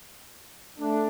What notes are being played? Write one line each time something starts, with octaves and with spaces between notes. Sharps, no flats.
A3 D4